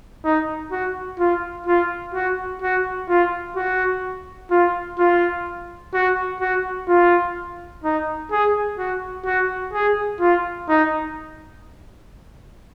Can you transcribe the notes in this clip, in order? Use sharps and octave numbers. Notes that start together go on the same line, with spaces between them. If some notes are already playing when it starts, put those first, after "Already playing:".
D#4
F#4
F4
F4
F#4
F#4
F4
F#4
F4
F4
F#4
F#4
F4
D#4
G#4
F#4
F#4
G#4
F4
D#4